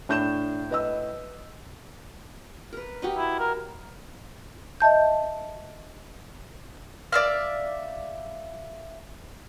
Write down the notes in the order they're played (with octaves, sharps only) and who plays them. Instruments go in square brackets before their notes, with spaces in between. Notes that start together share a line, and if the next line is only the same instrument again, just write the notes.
[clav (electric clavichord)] A2 [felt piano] D4 G6 E7
[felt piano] B4 D#5 E6
[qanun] A#4 B4
D#4 F#4 G4
[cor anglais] E4
A#4
[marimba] D#5 E5 A5 G6
[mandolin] D5 E5 F5